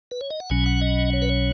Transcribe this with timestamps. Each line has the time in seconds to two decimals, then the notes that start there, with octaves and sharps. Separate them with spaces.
0.11 B4
0.21 C#5
0.30 D#5
0.40 F#5
0.50 B1 B2 F#3 C#4 G#5
0.66 F#5
0.81 D#5
1.13 C#5
1.22 B4
1.29 C#5